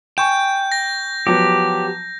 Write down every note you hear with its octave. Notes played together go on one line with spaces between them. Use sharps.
G5 G#5 C#6 G6 E7
A#6
F3 F#3 B3 G4